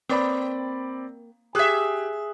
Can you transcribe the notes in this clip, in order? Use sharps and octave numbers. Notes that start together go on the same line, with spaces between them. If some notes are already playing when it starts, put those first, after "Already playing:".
A#3 C4 D5 B5
G4 G#4 E5 F#6